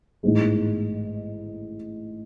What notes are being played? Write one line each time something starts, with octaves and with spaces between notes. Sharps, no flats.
A1 G#2 G#3